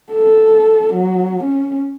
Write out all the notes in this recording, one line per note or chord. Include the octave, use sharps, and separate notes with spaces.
A4
F#3
C#4